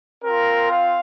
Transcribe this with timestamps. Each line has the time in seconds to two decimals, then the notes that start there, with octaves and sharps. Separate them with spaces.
0.24 C4 F4 A#4
0.71 F5